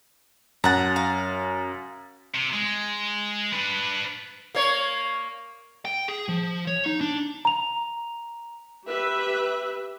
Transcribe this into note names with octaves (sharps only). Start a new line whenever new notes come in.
F#2 F#5 A#5 A6
F5
C3
G#3
D4 B4
A#3 C#5
G5
G#4
F3
C#5
D#4
D4
A#5 F7
G4 B4 E5